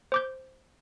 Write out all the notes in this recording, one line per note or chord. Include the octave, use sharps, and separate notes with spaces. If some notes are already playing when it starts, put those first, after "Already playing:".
C5 D6 G6